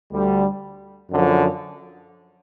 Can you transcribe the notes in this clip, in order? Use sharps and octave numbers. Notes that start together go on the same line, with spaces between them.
D2 D3 G3
F#2 D3 F3